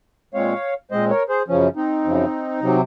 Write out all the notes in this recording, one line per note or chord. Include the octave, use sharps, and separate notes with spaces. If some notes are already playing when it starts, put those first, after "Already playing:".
A#2 G#3 C4 C#5 F5
A#2 G#3 C4 C5 D#5
A#4 C#5
G#4 C5
F#2 C#3 F3 C#4
C4 D#4
F#2 C#3 F3
C3 F#3 C4